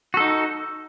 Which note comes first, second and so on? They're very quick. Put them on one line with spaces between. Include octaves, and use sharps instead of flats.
F#4 A4 D#4